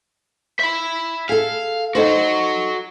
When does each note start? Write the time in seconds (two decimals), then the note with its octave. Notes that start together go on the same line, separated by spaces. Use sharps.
0.60 E5 B5
1.29 G#4 A4 F5
1.95 D#4 F#4 A4 C5 C#5